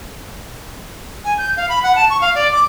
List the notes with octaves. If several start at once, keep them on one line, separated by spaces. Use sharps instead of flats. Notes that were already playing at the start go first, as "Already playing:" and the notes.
G#5
G6
F5
B5
F#5
A5
C#6
F5
D5
D6